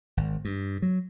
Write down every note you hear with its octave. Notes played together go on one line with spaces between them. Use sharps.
G#1
G2
F#3